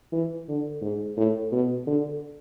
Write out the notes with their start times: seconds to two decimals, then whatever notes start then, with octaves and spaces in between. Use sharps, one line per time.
0.13 E3
0.49 D3
0.82 G#2
1.17 A2
1.52 B2
1.87 D3